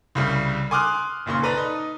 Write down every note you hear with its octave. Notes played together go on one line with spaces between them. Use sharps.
C2 C#3 G3
G#5 C6 D6 D#6 F6 F#6
G#1 A#2 C#3 C6
A4 B4 D5 A#5
D#4